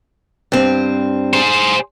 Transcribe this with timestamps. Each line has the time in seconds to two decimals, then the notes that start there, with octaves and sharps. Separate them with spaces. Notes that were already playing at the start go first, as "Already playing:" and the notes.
0.52 G2 C4
1.33 G#4 C5